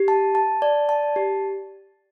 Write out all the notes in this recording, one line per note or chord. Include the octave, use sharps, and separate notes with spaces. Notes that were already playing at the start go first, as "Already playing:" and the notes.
Already playing: G4
A5
A5
D5
A5
G4